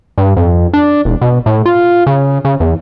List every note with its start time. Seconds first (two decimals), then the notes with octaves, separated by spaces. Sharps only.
0.18 G2
0.37 F2
0.73 D4
1.05 E1
1.21 B2
1.46 A2
1.66 F4
2.07 C#3
2.45 C#3
2.60 E2